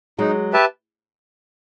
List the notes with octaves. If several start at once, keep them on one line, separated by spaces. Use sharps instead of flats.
F#3 G#3 D#4
G4 B4 E5 A5